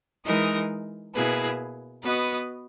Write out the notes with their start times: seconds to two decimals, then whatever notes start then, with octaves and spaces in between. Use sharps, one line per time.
0.25 E3 G#3 D#4 A#4 D#5
1.14 B2 A#3 E4 G#4 B4
2.03 B3 F#4 B4 D#5